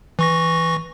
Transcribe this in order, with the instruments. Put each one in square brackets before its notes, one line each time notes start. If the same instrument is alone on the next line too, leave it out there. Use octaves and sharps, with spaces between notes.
[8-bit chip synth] E3 C#6 A#6